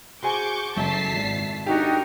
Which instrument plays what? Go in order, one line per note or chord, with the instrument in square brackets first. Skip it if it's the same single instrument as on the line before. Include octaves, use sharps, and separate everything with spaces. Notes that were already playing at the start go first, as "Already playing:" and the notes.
[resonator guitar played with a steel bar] F#4 C5 G#5 [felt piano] G#4 [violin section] C#6 D6 G6
[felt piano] F#1 [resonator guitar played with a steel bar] F#3 A3 E4 [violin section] A5 B6 C7
[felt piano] G#1
[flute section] D4 D#4 F#4 [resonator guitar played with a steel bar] G4 F5 [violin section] A#4